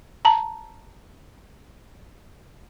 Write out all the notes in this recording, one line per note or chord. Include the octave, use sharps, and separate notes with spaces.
A5 A#5